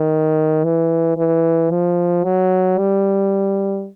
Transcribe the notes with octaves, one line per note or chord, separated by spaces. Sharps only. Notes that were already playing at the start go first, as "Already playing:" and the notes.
Already playing: D#3
E3
E3
F3
F#3
G3